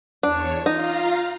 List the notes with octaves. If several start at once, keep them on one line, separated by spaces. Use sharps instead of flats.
E2 D4 C#5
D#4 F4 F5 A#5